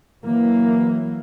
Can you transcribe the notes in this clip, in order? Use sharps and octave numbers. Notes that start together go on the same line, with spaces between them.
E3 F#3 A#3